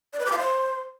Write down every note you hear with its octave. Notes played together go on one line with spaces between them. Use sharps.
D5
B4
D6
F5
C5